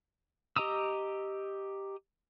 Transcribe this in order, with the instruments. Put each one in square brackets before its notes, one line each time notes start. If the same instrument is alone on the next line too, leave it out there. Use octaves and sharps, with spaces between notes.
[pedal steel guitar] G4 D#5 A#5 D#6 E6